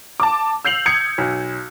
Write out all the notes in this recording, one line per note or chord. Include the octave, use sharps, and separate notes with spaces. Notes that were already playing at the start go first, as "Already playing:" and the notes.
A5 D6
E6 G6 C7 F7 F#7
D#6 G6 G#6 C#7
B1